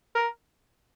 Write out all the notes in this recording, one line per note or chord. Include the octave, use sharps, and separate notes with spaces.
A#4